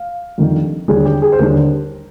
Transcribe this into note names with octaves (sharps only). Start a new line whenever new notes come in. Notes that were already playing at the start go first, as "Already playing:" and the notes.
Already playing: F5
F2 D#3 G3 D4
D#2 D3 G3 D4 G#4
G4
G#4
C5
D#2 D3 G3 D4 A#4